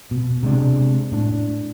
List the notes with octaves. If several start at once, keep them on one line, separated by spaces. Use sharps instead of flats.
B2
C3 G#3 D4
A2 D4